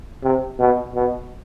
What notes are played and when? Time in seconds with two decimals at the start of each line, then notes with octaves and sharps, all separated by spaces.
0.23 C3
0.60 B2
0.95 B2